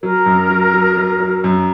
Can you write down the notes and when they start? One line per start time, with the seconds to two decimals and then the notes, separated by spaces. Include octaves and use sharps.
0.03 F#3 A#4
0.26 F#2
0.50 F#3
0.74 F#3
0.97 F#3
1.20 F#3
1.44 F#2